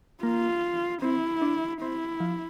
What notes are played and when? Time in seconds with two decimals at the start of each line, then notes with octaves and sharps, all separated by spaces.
0.23 A#3 F4
1.02 C4 E4
1.42 D4
1.81 C4 E4
2.20 F3